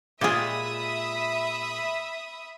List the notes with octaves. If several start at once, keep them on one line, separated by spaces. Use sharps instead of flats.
A#2 G#3 F4 G4 G#4 E5 B5 D#6